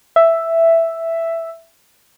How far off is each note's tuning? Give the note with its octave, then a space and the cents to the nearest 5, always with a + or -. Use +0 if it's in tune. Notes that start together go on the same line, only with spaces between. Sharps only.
E5 +5